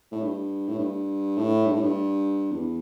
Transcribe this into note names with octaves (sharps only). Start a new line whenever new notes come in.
A2
G2
A2
G2
A2
G2
A2
G2
E2